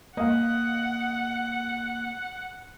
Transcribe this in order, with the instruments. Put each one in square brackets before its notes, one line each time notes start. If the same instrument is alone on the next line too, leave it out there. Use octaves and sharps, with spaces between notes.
[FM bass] A#3 [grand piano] D#5 F5 [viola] F#5